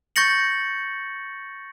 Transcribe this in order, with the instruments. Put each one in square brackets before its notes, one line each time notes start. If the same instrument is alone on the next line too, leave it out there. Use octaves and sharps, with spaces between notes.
[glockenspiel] C#6 G6 A6 A#6 C#7 F#7